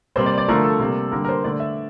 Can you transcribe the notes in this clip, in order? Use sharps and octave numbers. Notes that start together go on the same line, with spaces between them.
C3 G3 A#3 C5
D5
D5
D3 F3 A3 A#4
A4
C3 G3 A#3
D3 G3 A#3 A#4
A#4
C5
D3 A3 D5
E5